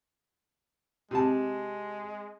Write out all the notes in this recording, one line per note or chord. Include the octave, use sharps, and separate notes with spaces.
C3 G#3 A5